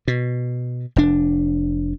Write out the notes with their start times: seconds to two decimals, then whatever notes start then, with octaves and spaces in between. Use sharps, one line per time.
0.08 B2
0.96 F1 D4